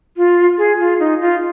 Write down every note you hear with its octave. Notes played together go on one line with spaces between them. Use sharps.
F4
G#4
F4
D#4
F4